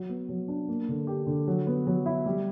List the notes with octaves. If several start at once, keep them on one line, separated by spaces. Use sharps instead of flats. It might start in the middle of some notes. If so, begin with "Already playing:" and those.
Already playing: F#3
B3
F#3
D4
A#3
D3
G4
D3
F#3
B3
F#3
E4
G3